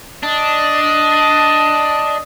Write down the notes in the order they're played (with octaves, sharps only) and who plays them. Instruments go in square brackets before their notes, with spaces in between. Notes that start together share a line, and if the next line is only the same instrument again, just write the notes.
[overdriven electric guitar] D4 [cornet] D#5